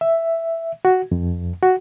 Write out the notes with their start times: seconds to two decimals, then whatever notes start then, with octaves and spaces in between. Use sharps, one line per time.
0.01 E5
0.85 F#4
1.12 F2
1.63 F#4